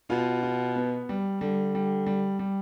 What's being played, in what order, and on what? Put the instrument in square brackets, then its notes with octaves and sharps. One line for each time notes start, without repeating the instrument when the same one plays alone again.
[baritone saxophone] B2 [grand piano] F4
[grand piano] F4
B3
G3
[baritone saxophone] D3 [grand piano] G3
[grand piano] G3
G3
G3